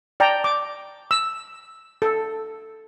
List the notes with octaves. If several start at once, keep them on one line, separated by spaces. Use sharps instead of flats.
D5 G5 A5 A#5
D6
E6
A4